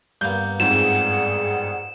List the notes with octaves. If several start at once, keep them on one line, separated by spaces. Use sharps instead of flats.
G2 A#3 B3 G6
F2 G#2 G#4 D5 F#5 E7